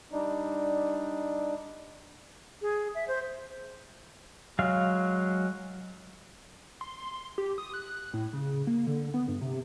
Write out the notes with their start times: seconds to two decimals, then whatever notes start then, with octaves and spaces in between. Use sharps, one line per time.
0.12 G3 D4 D#4
2.62 G#4
2.95 E5
3.08 C5
4.59 F#3 G#3 F5
6.81 C6
6.98 C6
7.38 G4
7.58 D#6
7.74 F#6
8.13 A2
8.33 C#3
8.67 A#3
8.87 D3
9.14 B3
9.28 G2
9.41 C3